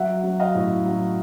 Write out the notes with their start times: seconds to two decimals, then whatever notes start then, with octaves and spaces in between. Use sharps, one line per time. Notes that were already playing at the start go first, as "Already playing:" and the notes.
Already playing: F#3 E5 F#5
0.24 F#3
0.40 D#5 F5
0.55 A2
0.85 F#3